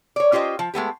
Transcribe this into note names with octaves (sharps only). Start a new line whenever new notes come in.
C#5 D5
C#4 F4 G4 C5 D#5
F3
G#3 A3 B3 G4